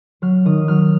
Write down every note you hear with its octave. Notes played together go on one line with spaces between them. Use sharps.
F#3 F6
D#3 D#6
F#3 F6